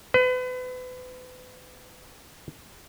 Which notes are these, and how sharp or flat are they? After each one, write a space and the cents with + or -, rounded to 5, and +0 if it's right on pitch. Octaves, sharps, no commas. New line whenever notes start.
B4 +35